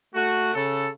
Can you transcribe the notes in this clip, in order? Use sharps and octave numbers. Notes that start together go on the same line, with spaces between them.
A3 F#4
C#3 A4